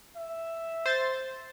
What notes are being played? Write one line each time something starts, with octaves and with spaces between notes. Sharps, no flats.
E5
C5 A6